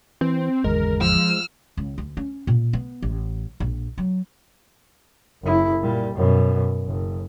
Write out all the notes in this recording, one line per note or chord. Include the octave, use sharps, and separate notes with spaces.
E3 C4
G#1 E2 D3 G#3 A#4
F3 E6 F6
C#2
D2
C#4
A#2
B3
A1
A#1
F#3
F#1 E4
A#2 G3
F#2 B2
F#1